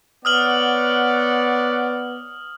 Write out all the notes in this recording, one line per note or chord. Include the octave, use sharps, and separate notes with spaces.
B3 C#5 D5 F#5 D#6 F6 F#7